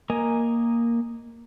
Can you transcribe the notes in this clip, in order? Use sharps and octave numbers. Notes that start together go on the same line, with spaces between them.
A#3 A#4 D#5 G#5 A#5